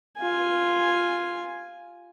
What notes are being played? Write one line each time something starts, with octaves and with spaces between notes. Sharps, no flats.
F4 G#5